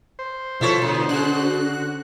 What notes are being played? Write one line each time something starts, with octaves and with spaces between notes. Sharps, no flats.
C5
B2 F3 E4 A4 C#5
A2 D3
C#3 F#4 F#6